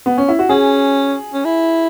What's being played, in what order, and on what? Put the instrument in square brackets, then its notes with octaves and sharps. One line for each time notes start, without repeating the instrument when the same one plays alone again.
[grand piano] B3
C#4
E4
F#4
[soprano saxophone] C#4 [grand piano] G#4
[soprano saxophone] C#4
E4